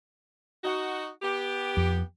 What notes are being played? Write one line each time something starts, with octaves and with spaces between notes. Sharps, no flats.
D#4 F#4
B3 G4
F2